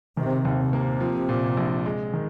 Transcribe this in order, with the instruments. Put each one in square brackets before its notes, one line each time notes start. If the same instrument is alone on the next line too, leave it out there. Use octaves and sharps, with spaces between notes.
[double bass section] C3 [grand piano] D#3
[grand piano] D#2
[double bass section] C3
[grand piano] A#3
F3
A#2
A#1
G#3
D#3